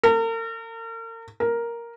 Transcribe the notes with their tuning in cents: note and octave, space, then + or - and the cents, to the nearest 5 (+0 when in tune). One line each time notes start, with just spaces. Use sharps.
A#4 -40
A#4 +5